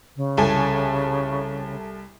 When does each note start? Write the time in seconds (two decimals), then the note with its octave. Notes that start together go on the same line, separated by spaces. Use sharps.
0.16 C#3
0.37 C2 A4 G#5